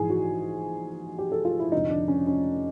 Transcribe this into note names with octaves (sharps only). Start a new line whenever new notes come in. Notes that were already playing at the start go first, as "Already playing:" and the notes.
Already playing: A#1 G#2 E3 G#4
F#4
G4
A4
F4
E4
F1 F2 D3 D#4
D4
C#4
C#4